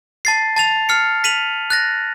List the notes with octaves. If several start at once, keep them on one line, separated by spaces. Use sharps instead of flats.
A5 A6 C7
A5 A6 F7
F6 C7 C#7
B6 D#7 F7 F#7
F#6 A6 A#6